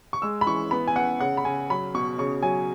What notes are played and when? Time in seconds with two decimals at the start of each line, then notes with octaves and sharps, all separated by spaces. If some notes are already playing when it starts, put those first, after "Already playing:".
0.13 C#6
0.22 G#3 E6
0.41 B5
0.47 E3 C#6
0.71 B3 B5
0.88 G#5
0.96 B3 F#5
1.20 C#3 F#5
1.37 B5
1.45 C#3 G#5
1.70 F#3 B5
1.94 B2 C#6
2.18 C#3 C#6
2.43 F#3 G#5